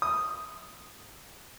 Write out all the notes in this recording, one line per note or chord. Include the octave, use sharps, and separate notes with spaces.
D#6